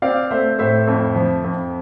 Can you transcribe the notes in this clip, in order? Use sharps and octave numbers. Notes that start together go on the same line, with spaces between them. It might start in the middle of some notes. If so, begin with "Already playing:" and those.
C4 D5 F5
A3 C5 E5
A2 C5 E5
F2
F3
F2